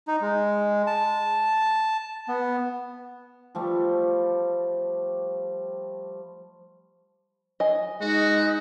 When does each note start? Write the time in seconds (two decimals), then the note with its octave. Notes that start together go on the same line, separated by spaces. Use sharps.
0.08 D#4
0.21 G#3
0.87 A5
2.28 B3
3.55 F3 G3 A3
7.60 D#5 G#5
8.01 G#3 D#4 F#4